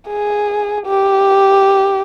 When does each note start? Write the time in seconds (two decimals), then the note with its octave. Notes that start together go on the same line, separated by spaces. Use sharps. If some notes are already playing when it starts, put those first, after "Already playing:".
0.09 G#4
0.86 G4